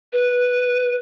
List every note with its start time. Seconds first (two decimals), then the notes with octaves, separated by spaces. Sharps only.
0.13 B4